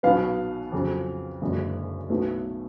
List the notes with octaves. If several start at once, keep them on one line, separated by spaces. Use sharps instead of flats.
B1 B2 F#3 B3 F5
F2 C#3 F#3
F#1 F#2 D3 G#3
B1 B2 A3